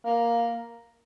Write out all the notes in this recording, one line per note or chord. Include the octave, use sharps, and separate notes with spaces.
A#3